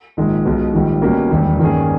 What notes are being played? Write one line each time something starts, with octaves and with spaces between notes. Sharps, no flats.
A#1 G#2 D#3 G#3
B1 B2 G#3 D#4
A#1 G#2 D#3 G3
B2 G3 A#3 C#4
E1 D#2 D#3 G3
G2 D#3 A#3 C#4 G#4